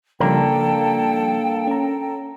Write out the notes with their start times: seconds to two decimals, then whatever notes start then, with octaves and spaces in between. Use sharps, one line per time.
0.20 C#3 F3 G3 A#3 D4 A4 A#4 G5
1.67 C#4 A#5